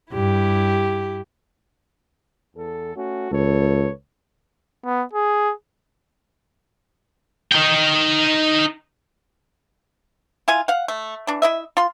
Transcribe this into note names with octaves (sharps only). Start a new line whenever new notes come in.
G2 E4 G4
E2 A4
A3 C#4 F#4
C#2 A4 B4 C#5
B3
G#4
D#4 G5
E4 F4 G#5
F5 F#5
A3
E3 D4
E4 D#5 E5
F4 C6